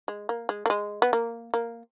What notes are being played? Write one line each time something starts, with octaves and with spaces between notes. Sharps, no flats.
G#3
A#3
G#3
A#3
G#3
B3
A#3
A#3